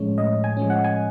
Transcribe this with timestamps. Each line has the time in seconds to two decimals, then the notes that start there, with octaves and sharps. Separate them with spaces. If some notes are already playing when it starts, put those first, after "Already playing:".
Already playing: A2 F3 G#3 C#4 C#5
0.18 A2 D#5
0.44 G#5
0.57 F3 G#3 C#4
0.70 F#5
0.84 G#5